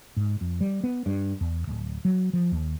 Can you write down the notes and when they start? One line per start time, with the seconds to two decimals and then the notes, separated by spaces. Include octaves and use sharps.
0.17 G#2
0.41 F2
0.61 G3
0.84 B3
1.06 G2
1.41 E2
1.67 D1
2.05 F#3
2.33 F3
2.52 D#2